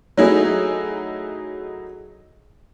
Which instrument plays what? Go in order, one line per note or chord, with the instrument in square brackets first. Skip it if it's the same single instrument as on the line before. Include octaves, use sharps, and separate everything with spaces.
[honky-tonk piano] F#3 A3 D#4 E4 G#4